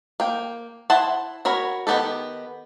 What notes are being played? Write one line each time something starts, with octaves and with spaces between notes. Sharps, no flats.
A#3 G5
E4 C5 F#5 A5
F#4 A#4 C#5 B5
D#3 F#3 B3 G4 A4